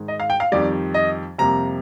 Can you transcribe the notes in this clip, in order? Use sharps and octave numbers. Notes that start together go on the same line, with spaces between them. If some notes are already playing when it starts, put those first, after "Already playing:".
Already playing: G#2 D#3 G#3
D#5
F5
G5
F5
F2 D#3 G3 D5
D#5
F2 C3 G3 A#3 A#5